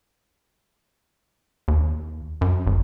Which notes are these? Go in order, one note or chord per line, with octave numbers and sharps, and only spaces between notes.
D#2
F#2
G#1